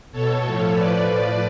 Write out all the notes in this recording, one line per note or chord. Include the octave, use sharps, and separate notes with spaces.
B2 A4 C#5
A2 F3
A2 F3 B4 D5
A2 F3